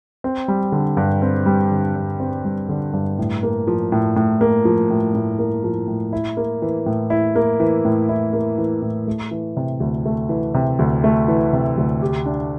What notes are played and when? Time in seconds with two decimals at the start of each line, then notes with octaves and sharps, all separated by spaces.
0.24 C4
0.48 G3
0.72 D3
0.97 G2
1.22 C4
1.46 G3
1.71 D3
1.96 G2
2.20 C4
2.45 G3
2.69 D3
2.93 G2
3.19 A2
3.43 A#3
3.67 F3
3.92 A2
4.16 A2
4.41 A#3
4.65 F3
4.90 A2
5.15 A2
5.39 A#3
5.64 F3
5.88 A2
6.13 E4
6.37 A#3
6.62 E3
6.86 A2
7.10 E4
7.36 A#3
7.60 E3
7.85 A2
8.09 E4
8.33 A#3
8.58 E3
8.82 A2
9.07 A3
9.31 E3
9.57 C3
9.80 D2
10.06 A3
10.29 E3
10.54 C3
10.79 D2
11.04 A3
11.28 E3
11.53 C3
11.77 D2
12.02 G4
12.26 D4